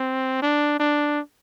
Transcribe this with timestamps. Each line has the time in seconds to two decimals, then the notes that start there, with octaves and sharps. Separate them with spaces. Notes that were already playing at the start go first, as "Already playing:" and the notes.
Already playing: C4
0.42 D4
0.80 D4